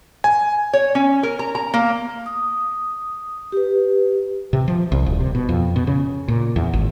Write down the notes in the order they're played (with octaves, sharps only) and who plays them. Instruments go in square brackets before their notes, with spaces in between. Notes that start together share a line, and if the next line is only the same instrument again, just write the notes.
[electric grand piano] G#5
[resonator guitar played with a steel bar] C#5
C#4
A#4
A#5
A#5
A#3
[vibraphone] D#6
G4 B4
[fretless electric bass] C3
F3
C2
D#1
C3
B2
F2
B2
C#3
A#2
E2
G#1